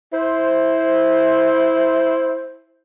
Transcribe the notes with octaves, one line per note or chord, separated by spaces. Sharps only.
E4 C5